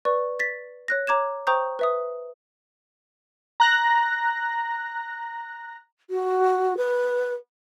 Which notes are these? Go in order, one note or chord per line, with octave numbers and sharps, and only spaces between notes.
B4 D5 C#6
A6 B6
C#5 F#6 A#6
C#5 A#5 D6 G#6 E7
C5 G5 A#5 C#6 D#6 G6
B4 E5 D#6
A#5 F#6 A#6
F#4
B4